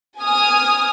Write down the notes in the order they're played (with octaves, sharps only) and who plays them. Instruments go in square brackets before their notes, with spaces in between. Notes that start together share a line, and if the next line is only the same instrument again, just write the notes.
[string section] G#5 D#6 F6